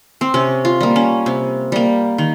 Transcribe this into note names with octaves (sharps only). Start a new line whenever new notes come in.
C4
C3 C#4
F4
G3 A#3
C#4
C3
G3 A#3
D#3